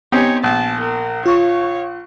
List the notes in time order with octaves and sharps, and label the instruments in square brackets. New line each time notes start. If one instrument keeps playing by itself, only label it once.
[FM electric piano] B3 G#5 [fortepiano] C4 D#4 G4 [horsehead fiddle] C#5
[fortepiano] A#1 [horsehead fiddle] A5
[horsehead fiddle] A#4
[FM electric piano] F4 C#6 [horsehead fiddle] C#5 F5